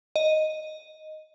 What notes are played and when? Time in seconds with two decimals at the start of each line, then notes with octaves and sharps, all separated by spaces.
0.16 D#5